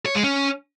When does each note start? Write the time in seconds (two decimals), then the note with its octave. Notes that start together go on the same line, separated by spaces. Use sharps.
0.06 C#5
0.15 G#3
0.23 C#4